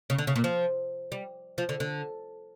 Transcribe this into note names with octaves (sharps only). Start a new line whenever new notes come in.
C#3
D3
C#3
A#2
F3
G3
F3
D3
D3